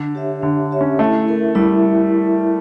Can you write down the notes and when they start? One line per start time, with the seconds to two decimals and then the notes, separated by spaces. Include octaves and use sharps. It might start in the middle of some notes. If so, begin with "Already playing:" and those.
Already playing: D3 D4
0.15 G4 C#5 E5
0.42 D3 D4
0.71 G4 C#5 E5
0.81 C#4
0.99 A3 E4
1.27 A#4 E5
1.55 G3 E4